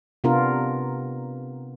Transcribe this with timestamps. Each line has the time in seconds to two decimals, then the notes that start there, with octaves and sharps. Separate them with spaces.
0.24 C3 B3 D4 F4 A#4